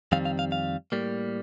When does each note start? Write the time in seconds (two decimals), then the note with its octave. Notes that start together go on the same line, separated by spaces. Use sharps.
0.12 F2 D#3 G3 C4 F5
0.25 F5
0.39 F5
0.52 F5
0.92 A2 G3 A#3